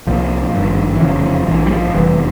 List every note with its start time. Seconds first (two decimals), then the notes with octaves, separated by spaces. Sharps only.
0.07 C2 A#2 F3
0.54 G#1 G2
0.96 E3
1.00 F1 E2 C#3 F3
1.23 F3
1.47 A#1 G#2 E3
1.66 G3
1.71 F3
1.94 F1 E2 C3 E3 G3